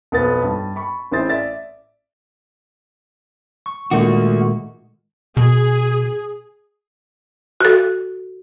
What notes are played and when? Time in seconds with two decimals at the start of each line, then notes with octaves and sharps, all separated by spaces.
0.12 B1 F2 B3 B4 A6
0.43 G2
0.76 B5 C#6
1.11 A1 C4 E4 G#4 C5 A6
1.29 D5 E5 A6
3.66 C#6
3.91 A#2 D#3 G#3 A3 F#4
5.37 B2 G#4
7.61 F#4 A4